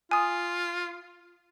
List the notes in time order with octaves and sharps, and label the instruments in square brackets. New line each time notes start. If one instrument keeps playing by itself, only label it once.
[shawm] F4 [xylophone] G#5 D#6